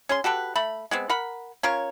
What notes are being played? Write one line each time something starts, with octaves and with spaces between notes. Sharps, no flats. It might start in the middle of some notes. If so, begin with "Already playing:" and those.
C#4 G#4 C6
F#4 G4 A4 B4
A3 B5
G#3 B3 C4
A#4 F#5 B5
C#4 F4 A#4 C#5